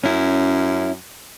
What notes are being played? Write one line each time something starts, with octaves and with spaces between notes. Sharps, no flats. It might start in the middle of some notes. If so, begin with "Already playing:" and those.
F#2 C#4 E4